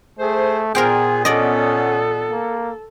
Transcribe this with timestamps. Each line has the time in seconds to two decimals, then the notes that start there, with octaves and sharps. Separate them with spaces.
0.19 A3 G#4 C5
0.75 A#2 B3 G#4 A#4 C5 G5
1.25 C#4 A4 D5 D#5
2.31 A#3